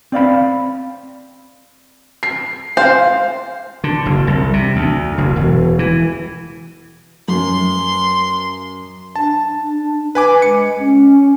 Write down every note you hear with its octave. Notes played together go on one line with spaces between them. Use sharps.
C4 D5 F5 B5
C7
C5 F5
D3
F#1
C2
C3
D2
F#1
E1
E3
F#2 C6
D4 A5
B4 G#5 D6
G#3 C#7
C#4